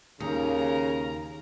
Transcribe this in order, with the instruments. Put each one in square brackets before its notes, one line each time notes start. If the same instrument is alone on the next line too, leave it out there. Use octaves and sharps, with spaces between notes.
[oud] D#2 [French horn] C#3 [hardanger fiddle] A#4 A#5